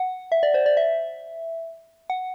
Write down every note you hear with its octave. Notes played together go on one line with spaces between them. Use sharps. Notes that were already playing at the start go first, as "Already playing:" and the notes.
Already playing: F#5
E5
D5
C5
D5
E5
F#5